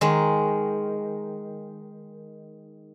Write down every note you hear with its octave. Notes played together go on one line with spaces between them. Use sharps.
D#3 G#3